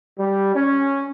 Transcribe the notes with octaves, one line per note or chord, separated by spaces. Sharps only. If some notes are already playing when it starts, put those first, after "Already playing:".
G3
C#4